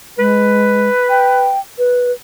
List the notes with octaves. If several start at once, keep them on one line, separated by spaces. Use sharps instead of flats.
G#3 B4
G5
B4